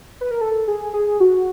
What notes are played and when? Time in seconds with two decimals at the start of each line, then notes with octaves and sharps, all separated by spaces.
0.21 B4
0.31 A#4
0.41 A4
0.68 G#4
0.94 G#4
1.20 F#4